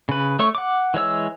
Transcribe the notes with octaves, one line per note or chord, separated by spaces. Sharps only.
C#3 B4
A3 C#5 C#6
F#5 D6
E3 G#3 C#5 E6